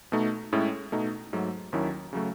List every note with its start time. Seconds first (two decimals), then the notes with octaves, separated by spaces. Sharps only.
0.12 B2 A3 D#4
0.52 A2 G#3 C#4 E4
0.92 B2 A3 D#4
1.33 G#2 F#3 A3
1.73 D#2 D#3 F#3 C#4 E4
2.13 C#3 F#3 A3